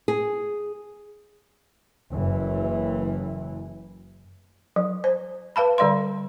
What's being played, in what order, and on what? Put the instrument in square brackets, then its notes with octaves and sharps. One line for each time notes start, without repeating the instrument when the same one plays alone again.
[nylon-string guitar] G#4
[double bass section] F#1 E3
[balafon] F#3
C5
B4 F5 A5 B5
D3 G3 D5 F5 C6